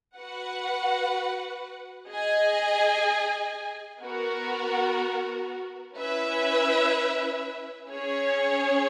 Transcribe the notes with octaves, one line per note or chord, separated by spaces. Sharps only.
F#4 B4 F#5
G#4 D#5 G#5
B3 F#4 A#4
C#4 E4 B4 E5
C#4 G#4 C#5